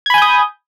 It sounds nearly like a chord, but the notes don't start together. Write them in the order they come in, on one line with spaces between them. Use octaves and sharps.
G#6 B5 G#5 G6 D#6